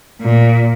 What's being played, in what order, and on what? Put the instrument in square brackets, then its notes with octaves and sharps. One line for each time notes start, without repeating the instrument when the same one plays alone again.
[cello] A#2